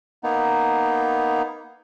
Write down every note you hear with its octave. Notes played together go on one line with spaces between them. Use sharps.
A#3 B3 D#4